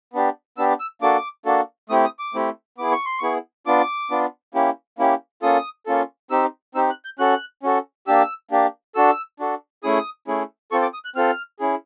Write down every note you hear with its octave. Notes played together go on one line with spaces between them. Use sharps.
B3 D4 G4
B3 D4 G4 E6
E6
A#3 D4 F#4 A4 D6
A#3 D4 F#4 A4
A3 C4 E4 G4 D#6
D#6
D6
A3 C4 E4 G4
B3 E4 G#4 D6
C#6
C6
B3 E4 G#4 C#6
B3 D4 F4 D6
B3 D4 F4
A#3 C#4 E4 G4
A#3 C#4 E4 G4
A#3 C#4 F4 A4 D#6
A#3 C#4 F4 A4
C4 D#4 G4 E6
C4 D#4 G4 E6
F#6
G6
C#4 F#4 A4 F#6
C#4 F#4 A4
A#3 D4 G4 E6
A#3 D4 G4
D4 F#4 A4 E6
D4 F#4 A4
A3 C#4 E4 G#4 D#6
A3 C#4 E4 G#4
C4 F4 A4 C#6
D6
D#6
F#6
C4 F4 A4 F6
C#4 E4 G#4